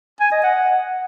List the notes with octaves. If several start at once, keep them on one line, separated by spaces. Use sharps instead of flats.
G#5
D#5
F#5